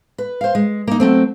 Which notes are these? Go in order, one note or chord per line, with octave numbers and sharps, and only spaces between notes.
B4
C5 F5
G#3
A#3 D#4
F#3 A3 C4